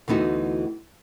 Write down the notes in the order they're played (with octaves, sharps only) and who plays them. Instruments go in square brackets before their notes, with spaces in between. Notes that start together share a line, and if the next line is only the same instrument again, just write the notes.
[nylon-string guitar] D2 E3 B3 D#4 F#4